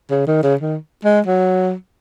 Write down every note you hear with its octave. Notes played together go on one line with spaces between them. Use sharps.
C#3
D#3
C#3
D#3
G#3
F#3